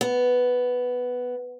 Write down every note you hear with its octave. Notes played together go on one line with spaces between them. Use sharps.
B3